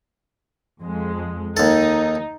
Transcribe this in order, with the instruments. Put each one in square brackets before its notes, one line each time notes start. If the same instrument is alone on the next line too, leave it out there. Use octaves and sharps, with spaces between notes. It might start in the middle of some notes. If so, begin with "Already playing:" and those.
[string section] F2 G#3
[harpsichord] D#2 A4 [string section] D#4